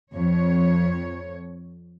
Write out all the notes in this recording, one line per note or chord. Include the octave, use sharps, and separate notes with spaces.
F2 C#5